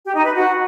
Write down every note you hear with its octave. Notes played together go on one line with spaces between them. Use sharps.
G4
D#4
B4
F#4